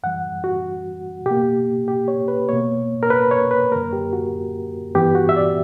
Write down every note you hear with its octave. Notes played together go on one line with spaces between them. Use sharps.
F#2 E3 G3 F#5
F#4
B2 A#3 G4
G4
C#5
B4
B2 A#3 C#5
A#4
B4
C#5
B4
F#2 D3 A#3 A#4
G4
F#4
G2 E3 B3 G4
F#4
E5
D5